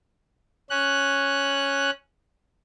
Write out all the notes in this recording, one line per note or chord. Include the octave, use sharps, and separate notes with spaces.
C#4 F#6